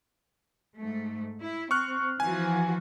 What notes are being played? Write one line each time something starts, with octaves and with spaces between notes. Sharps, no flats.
G#2 A3
E4
C4 C#6 F6 F#6
E3 F3 F#4 G#5